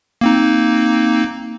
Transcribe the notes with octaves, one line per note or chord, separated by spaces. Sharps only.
A#3 C4 D#4